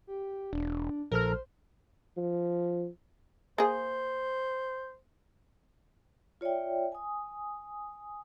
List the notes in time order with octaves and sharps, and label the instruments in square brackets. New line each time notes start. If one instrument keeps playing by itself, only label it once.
[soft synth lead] G4
[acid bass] E1 [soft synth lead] D4
[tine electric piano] A#1 A4 F6 [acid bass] A#4 [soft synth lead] C5
[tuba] F3
[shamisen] A#3 G#4 [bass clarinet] C5
[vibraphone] F4 C#5 D5 E5 G5
G#5 D#6